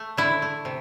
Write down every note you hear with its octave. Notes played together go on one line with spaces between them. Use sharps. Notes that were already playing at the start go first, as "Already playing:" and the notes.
Already playing: A3
D3 E4
A3
C3